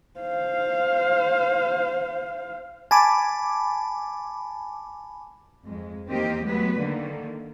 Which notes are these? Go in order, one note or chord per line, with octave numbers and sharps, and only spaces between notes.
C5 F5
G#5 A5 B5 D6
F2 G#3
E2 D#3 A#3 C4 G4 D#5
F#3 G#3 A3 B3 B4
D3 D#3 A#3